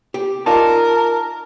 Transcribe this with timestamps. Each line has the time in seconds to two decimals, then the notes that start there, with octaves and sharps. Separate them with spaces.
0.14 G4
0.46 D#4 F4 A#4 D5 A5